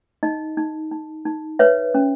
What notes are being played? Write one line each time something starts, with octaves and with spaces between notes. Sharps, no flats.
D#4 D#5
D#4
D#4
D#4
B4 C#5 E5
C#4